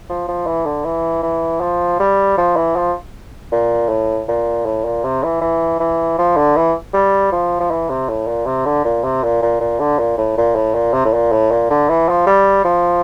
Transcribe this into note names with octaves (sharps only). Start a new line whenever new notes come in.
F3
F3
E3
D3
E3
E3
F3
G3
F3
E3
F3
A#2
A2
A#2
A2
A#2
C3
E3
E3
E3
F3
D3
E3
G3
F3
F3
E3
C3
A2
A#2
C3
D3
A#2
C3
A#2
A#2
A#2
D3
A#2
A2
A#2
A2
A#2
C3
A2
A#2
A2
A#2
D3
E3
F3
G3
F3